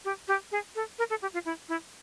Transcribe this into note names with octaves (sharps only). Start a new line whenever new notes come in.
G4
G4
G#4
A4
A#4
A4
G4
F4
E4
E4